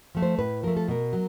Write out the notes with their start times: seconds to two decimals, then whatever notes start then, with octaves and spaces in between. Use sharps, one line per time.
0.15 F3 A3
0.22 C5
0.39 A2 B4
0.63 F3 A3 A#4
0.77 A4
0.89 B2 A#4
1.13 F#3